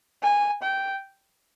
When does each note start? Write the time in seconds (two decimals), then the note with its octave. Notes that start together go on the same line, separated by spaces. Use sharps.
0.23 G#5
0.62 G5